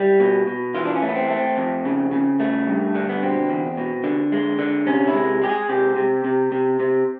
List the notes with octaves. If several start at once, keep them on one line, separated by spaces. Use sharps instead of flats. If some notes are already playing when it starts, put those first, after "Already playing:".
Already playing: G3 E4
B2
B2
E3 F4
D4
C#4
A3
B3
C4
A3
C4
F2
C#3
C#3
A3
G2
D3
B3
B2 C4
E2
B2
D3
G#3
D3
C3 C#4
E4
G#3
G#3 G4
G#4
C3 G4
C3
C3
C3
C3